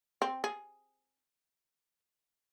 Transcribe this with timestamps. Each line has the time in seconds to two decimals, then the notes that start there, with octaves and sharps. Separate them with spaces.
0.22 C4
0.44 G#4